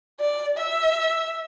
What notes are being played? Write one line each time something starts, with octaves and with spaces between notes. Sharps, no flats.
D5
E5